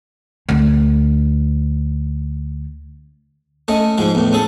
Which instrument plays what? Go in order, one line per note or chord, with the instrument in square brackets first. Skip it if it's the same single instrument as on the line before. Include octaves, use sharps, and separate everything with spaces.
[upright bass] D2 D4
[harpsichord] A3 C#4 D#5
G#2 F3 G#3
E2 A2
C#4 G#4 A4